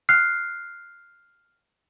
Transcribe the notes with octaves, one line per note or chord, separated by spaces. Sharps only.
F6 F#6 C7